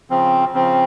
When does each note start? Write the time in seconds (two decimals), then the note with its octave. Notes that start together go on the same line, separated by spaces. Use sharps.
0.10 C#3 F3 C4
0.53 C#3 F3 C4